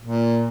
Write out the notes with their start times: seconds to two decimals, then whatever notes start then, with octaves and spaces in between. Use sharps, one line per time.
0.02 A#2